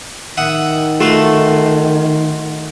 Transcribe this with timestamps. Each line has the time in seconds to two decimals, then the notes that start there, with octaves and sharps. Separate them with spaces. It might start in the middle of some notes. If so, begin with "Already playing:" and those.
0.37 D#3 E5 F#5 D#6
1.00 A3 F4 F#4 C6